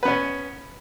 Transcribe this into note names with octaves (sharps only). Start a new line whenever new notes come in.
B3 C#4 B4